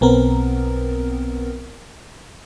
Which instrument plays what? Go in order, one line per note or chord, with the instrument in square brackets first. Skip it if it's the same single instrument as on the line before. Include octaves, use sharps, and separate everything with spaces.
[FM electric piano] B1 B3 C4 A#4